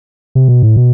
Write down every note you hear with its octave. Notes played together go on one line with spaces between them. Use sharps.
C3
B2
A2
B2